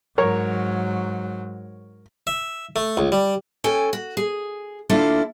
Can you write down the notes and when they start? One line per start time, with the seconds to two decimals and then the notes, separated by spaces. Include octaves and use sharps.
0.18 G#2 F#3 A#4 C#5
2.27 E5
2.76 A3
2.97 C#2
3.12 G3
3.64 C#4 A4 G5 G#5
3.93 F#4
4.17 G#4
4.90 D2 A#3 D4 E4 F4 A4